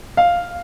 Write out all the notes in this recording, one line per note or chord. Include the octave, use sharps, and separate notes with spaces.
F5